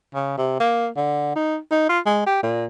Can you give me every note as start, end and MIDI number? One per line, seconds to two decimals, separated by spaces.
0.14 0.34 49
0.38 0.59 48
0.60 0.88 58
0.96 1.34 50
1.36 1.57 63
1.71 1.84 63
1.89 1.99 65
2.06 2.23 56
2.27 2.40 67
2.43 2.66 46